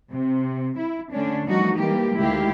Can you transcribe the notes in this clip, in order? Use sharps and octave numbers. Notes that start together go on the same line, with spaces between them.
C3
E4
D3 A3 C#4 D4
E3 F3 G3 A3 D#4 F#4
E3 G3 G#3 A#3 G4
D2 D#3 G#3 E4 G4 F5